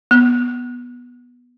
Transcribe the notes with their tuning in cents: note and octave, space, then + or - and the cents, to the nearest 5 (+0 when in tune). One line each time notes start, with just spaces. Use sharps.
B3 -10